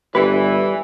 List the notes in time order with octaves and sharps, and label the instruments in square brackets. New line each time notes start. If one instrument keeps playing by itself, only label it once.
[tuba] G1 [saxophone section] E3 [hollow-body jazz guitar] G3 G4 B4